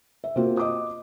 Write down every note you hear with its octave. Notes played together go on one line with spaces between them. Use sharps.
E5
C3 A#3 C4 F4 F#4
D#5 D6 D#6